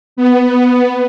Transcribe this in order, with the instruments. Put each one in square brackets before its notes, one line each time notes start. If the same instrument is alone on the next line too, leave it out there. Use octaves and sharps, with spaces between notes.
[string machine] B3